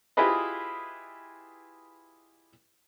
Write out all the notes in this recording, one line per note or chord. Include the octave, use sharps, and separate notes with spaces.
E4 F4 G4 G#4 B4 D#5